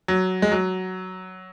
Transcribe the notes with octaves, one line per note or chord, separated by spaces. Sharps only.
F#3
G#3
F#3